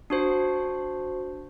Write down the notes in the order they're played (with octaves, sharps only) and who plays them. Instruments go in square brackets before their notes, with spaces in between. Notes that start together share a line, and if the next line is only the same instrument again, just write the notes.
[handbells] D4 F#4 C5